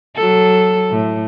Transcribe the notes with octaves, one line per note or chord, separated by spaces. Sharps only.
F#3 A4
A2